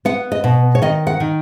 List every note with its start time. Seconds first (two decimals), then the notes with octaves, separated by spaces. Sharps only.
0.05 B3 F#5
0.32 D#5
0.44 B2
0.75 C#5
0.82 D#3 D#5
1.07 F#5
1.20 D#3